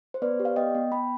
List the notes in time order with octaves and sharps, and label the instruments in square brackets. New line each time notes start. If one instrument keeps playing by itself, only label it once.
[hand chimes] C5
B3 B4 D5
G4
D5 F5
B3 D#5 G5
B3
B3 G5 B5